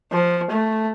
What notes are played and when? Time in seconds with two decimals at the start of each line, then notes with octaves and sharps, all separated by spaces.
0.12 F3
0.51 A3